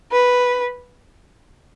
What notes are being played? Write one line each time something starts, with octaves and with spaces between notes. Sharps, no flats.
B4